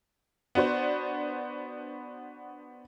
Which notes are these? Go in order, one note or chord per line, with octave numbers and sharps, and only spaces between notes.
B3 D4 F#4 C5